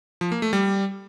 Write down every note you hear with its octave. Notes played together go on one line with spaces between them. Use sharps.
F3
A#3
A3
G3